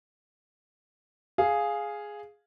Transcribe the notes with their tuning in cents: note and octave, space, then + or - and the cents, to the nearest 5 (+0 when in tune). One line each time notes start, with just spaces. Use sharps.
G#4 +0 F5 +0